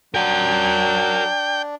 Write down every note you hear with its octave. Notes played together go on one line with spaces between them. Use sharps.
F#3 D4 A#4 F#5 G5